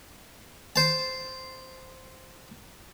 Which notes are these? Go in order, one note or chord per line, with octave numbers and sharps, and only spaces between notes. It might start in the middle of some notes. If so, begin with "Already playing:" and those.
C5 A5